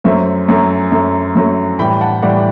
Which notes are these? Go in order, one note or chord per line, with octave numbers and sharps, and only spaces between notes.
F#2 F#3 A3 C5 E5
F#2 F#3 A3
F#2 F#3 A3
F#2 F#3 A3
A2 E3 G3 G5 B5
F#5 A5
A2 E3 G3 D5 F#5